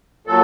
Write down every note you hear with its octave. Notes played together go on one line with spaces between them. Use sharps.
A#2 F#3 A4